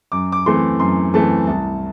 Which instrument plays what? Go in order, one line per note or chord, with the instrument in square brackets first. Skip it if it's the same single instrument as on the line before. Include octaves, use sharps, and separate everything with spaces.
[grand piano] F#2 D6
D6
E3 A3 C4 C6
F#2 C6
E3 A3 C4 A5
C2 A5